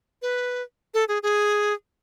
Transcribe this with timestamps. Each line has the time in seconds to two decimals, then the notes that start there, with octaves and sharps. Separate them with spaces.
0.22 B4
0.94 A4
1.08 G#4
1.23 G#4